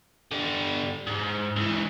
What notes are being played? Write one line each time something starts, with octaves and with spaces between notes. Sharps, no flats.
D3 G3
G#2
C#2 E3